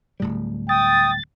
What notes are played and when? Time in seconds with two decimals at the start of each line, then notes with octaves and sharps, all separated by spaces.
0.20 D1 A2 G3
0.69 G5 D#6 A6